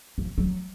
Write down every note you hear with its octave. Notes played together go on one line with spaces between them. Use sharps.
F3
F#3